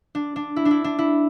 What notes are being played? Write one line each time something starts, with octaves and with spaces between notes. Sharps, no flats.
D4
D4
E4
D4
E4
D4
E4